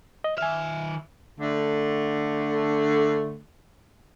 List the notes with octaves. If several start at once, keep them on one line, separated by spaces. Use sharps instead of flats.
D#5
D#3 E5 G#5 F6
D3 A3